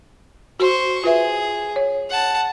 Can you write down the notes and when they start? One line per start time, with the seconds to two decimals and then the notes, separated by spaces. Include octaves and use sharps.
0.60 F#4 C5 C#6
1.04 F4 G#4 B4 E5
1.76 C#5
2.10 F#5 A5